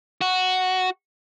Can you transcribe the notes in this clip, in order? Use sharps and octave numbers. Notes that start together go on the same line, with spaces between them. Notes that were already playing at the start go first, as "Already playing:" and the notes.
F#4